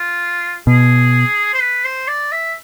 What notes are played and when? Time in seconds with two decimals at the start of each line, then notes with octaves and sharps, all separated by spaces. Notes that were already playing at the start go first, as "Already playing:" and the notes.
Already playing: F4
0.67 B2 G#4
1.54 C5
1.61 B4
1.85 C5
2.08 D5
2.32 E5